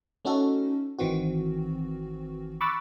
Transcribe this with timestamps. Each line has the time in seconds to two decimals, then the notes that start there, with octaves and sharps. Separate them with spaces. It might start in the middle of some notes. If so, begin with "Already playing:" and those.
0.25 A3 C#4 D#4 F#4 A4
0.99 G#1 D#3 E3 C4 F#4
2.61 B5 C#6 D6 E6 F#6 A6